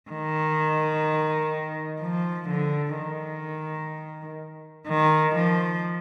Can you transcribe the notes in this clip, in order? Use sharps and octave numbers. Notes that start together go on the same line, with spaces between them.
D#3
F3
D3
D#3
D#3
F3